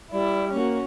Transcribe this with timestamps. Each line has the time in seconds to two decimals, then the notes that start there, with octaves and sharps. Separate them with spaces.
0.12 G3 E4 D5
0.53 A#3 C#4 F#4